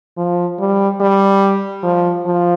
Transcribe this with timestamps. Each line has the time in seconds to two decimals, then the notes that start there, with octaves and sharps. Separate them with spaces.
0.17 F3
0.59 G3
1.00 G3
1.83 F3
2.26 F3